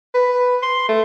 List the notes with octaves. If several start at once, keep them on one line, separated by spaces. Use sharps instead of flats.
B4
C6
A3